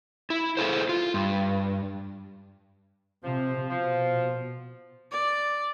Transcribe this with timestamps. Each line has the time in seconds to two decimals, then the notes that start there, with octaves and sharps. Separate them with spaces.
0.30 E4
0.57 E4 G#4 A4 C5
0.89 F4
1.14 G2
3.23 C3 F3
3.70 B2 F3
5.11 D5